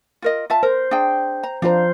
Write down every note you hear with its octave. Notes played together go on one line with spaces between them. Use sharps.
F4 A#4 D#5
F4 E5 A5
A#4 C5
D4 G#4 G5
A#5
F3 D4 F4 C5 A#5